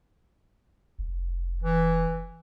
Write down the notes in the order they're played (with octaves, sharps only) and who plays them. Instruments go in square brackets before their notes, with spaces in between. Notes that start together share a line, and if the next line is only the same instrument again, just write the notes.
[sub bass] F1
[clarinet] E3